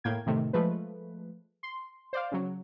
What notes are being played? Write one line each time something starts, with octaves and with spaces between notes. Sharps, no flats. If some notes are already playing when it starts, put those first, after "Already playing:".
A2 A#3 G5 G#6
A2 C3 D#3 A3
F3 G#3 A3 B4
C6
C5 D5 F5
C#3 F#3